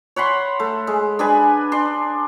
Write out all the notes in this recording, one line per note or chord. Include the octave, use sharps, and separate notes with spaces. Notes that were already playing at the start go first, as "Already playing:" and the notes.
C#5 F#5 B5 C6
A3
G#3
D4 G#4 B4 G#5
D4 C6